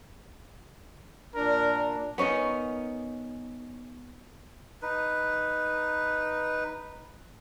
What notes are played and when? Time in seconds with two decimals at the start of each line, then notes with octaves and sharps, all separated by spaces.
1.36 A#2 D4 A#4
2.18 B3 C#4 D#4 A#4
4.82 D#4 B4